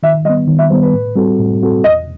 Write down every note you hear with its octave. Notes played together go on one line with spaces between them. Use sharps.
D#3 E5
G3 B3 D#5
D#3
E5
G3 B3 C5
B4
A2
G3 C4 F#4 A4
A2
G3 C4 F#4 A4
E2 D#5